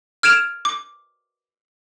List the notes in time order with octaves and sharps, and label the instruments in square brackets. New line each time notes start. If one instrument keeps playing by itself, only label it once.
[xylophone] F6 G#6 D7 E7 F7
D6